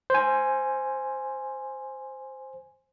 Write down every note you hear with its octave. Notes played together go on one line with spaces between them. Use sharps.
C5 G#5